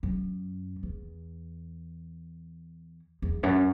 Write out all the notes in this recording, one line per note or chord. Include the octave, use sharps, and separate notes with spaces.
F#2
E2
E2
F#2